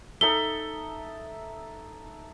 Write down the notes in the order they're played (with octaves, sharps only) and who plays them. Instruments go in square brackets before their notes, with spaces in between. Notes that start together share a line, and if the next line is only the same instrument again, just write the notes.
[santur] D#4 A4 E5 [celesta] G7